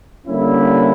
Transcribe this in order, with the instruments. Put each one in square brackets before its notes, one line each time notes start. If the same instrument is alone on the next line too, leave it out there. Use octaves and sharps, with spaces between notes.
[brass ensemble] D3 G3 A#3 C#4 E4